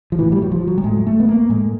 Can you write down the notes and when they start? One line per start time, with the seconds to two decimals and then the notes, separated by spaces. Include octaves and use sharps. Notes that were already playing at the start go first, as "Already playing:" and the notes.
0.12 F3
0.18 A2 E3
0.32 G3
0.42 F#3
0.51 F3
0.67 F#3
0.78 G3
0.84 A2 G#3
1.07 A3
1.20 B3
1.28 A#3
1.49 A2 G#3